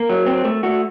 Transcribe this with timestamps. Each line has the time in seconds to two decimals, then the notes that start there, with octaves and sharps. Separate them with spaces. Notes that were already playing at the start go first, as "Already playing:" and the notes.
Already playing: A#3 A#4
0.10 F#3
0.27 C4
0.45 A3
0.63 A3 F#4